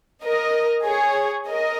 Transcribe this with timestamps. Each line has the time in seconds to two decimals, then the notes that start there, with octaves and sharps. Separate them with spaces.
0.23 A#4 D#5
0.86 G#4 C#5
1.49 A#4 D#5